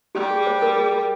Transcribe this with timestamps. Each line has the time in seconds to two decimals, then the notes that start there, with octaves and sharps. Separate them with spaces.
0.15 G3 G4
0.31 G#4
0.47 C5
0.62 A#4
0.76 G#4
0.92 A#4